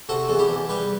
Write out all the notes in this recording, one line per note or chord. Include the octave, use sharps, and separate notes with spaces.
C3 F#4 A4
E2 A4
E4 G4
E2
G3 G4 B4